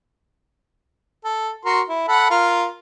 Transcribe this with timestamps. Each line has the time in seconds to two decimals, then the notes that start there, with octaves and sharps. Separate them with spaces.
1.25 A4
1.65 F#4 A#4 C6
1.89 E4
2.08 A4 F#5 B5
2.30 F4 A#4 F5